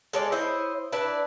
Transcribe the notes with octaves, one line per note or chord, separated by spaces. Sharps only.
G#3 A4 C#5 D5
E4 C5 C#5 D#5
D4 E4 B4